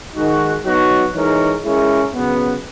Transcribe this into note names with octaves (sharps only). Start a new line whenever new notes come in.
D#3 G#3 D#4 F#4
F#3 B3 D#4 F#4
E3 G#3 D#4 A#4 C#5
G#3 C#4 E4 A#4 C#5
C#3 F#3 B3